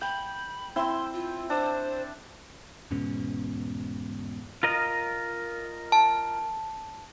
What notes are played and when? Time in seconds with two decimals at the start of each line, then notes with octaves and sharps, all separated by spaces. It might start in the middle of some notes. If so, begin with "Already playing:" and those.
0.01 G5 B5
0.76 C4 E4 C5 C6
1.14 F4
1.50 D4 C5
2.91 E2 G#2 B2 C#4
4.63 F4 A#4 D#5
5.92 A5